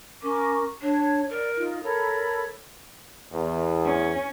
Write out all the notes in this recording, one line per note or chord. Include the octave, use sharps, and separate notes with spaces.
C#4 A#4 C#6 D6
D4 C#5
A#4 D5
D#4 F4
A4 A#4 C#5 B5
E2
C#4